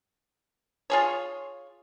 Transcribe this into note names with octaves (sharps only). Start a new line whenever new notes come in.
F4 G#4 C#5